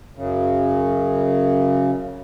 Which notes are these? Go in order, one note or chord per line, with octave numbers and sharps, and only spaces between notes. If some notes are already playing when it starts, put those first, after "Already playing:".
F#2 C#3